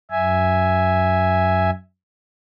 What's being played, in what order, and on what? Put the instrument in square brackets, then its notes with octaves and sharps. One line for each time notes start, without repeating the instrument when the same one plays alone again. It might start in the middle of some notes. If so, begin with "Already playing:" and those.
[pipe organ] F#2 E5 G#5